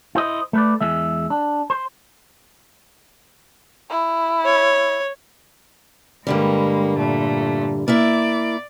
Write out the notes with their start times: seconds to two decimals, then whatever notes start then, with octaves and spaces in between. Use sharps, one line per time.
0.15 E4 C5 D#5
0.53 A3 B4 D5
0.81 E2 G#3 E5
1.30 D4
1.70 C5
3.90 E4
4.45 C#5
6.27 G2 D3 G3 G#3 A#3
6.97 A#2 A3
7.88 A#3 E4 D5 E5